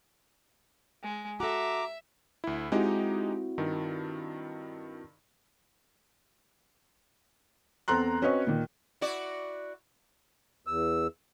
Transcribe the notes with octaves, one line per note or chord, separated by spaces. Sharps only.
G#3
F#4 A4 E5 A#5 D6
D2 E4
G#3 C4 D#4 E4 F#4 G4
G2 D#3
E2 C4 A4 A#5 C6 F#6
C4 C#4 F#4 B4 C#5 D#5
A#2 D#3
E4 F#4 D5
E2 E6